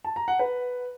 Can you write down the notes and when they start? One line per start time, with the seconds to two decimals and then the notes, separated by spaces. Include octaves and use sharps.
0.05 A5
0.16 A#5
0.28 F#5
0.39 B4